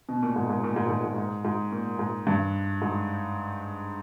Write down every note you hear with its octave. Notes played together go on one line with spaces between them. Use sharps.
B2
A#2
G#2
G#2
A#2
G#2
G#2
G#2
G#2
G#2
A#2
G#2
G2
G#2